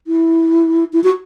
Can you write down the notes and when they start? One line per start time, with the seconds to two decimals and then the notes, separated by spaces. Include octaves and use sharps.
0.07 E4
0.93 E4
1.04 F#4